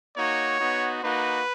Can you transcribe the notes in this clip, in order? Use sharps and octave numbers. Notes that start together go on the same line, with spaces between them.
A#3 D#4 F#4 C#5
B3 D#4 F#4
A#3 D#4 F#4 B4